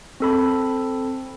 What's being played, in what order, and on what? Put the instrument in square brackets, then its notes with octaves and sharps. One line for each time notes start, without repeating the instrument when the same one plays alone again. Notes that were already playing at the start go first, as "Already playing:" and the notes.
[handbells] C4 A4 B5